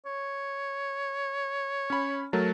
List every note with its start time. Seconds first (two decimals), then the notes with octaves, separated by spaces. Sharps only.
0.06 C#5
1.90 C#4 B5
2.33 F#3 A3 A#4 A5